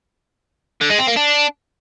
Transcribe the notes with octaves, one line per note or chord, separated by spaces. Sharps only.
D3
G#3
C4
A#3
D4